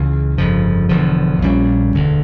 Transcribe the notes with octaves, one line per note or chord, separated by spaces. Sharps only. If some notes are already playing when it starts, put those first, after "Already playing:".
Already playing: C#2 C#3 E3
G1 F2 C#3 F3
E1 E2 D3 F3
A#1 A#2 G3 C#4
E1 D2 D3